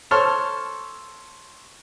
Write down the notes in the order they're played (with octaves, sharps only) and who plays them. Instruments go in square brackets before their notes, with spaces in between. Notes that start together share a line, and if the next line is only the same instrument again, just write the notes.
[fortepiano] A4 C5 C#5 A5 C6 F6